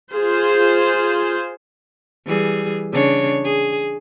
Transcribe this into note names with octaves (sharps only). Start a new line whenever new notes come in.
F4 G#4 C5
E3 G3 G#4
C#3 D4 C#5
G#4